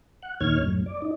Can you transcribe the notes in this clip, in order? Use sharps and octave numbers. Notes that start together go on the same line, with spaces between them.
F#5
D#2 A#2 D#3 C#5 F6 G#6
F#2 A2
D5
D#4